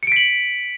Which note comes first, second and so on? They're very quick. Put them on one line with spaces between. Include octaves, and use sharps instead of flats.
C#7 D7 B6 F#7